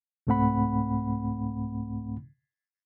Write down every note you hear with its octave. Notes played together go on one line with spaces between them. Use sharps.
C2 G#2 A3 C4 F#5 B5